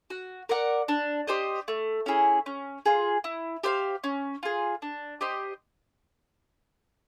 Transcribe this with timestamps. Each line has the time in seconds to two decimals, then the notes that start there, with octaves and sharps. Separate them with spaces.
0.10 F#4
0.49 A#4 D5 F#5
0.88 D4
1.28 G4 C5 D#5
1.68 A3
2.06 C#4 E4 G#4
2.46 C#4
2.86 F4 G#4
3.24 E4
3.64 G4 C5 F5
4.04 C#4
4.43 F4 G#4
4.82 D4
5.21 G4 C5 D#5